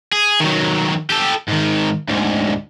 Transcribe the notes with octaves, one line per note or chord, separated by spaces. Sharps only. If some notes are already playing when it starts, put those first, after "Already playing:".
G#4
D#3 F#3
G4 A4
G#2 D#3
D2 G#2